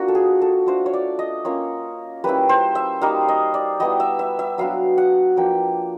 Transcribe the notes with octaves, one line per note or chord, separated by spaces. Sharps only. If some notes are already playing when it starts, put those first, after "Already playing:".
Already playing: A#3 D4 F4 F#4
A4
G#4
A4
A3 D4 F4 C5
C#5
D5
D#5
A#3 C#4 F4 C#5
G3 A#3 C#4 E4 B4
C5
E5
G3 A#3 D#4 F5
D#5
D5
G3 B3 E4 D#5
E5
E5
E5
F#3 B3 D4 F5
F#5
F3 A#3 D4 G5